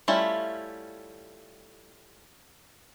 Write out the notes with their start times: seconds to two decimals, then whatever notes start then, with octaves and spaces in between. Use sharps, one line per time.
0.08 G3 A3 C#4 E4 F4